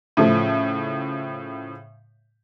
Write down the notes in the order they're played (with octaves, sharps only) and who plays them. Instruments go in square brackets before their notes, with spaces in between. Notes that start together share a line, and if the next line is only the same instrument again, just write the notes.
[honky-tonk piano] A2 C#3 F3 A3